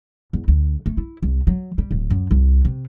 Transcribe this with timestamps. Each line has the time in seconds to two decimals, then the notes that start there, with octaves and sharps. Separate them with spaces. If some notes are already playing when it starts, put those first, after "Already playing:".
0.33 E2
0.48 D2
0.86 A3
0.97 E4
1.23 C2
1.47 F#3
1.78 G3
1.91 D1
2.10 F#2
2.31 C2
2.65 C3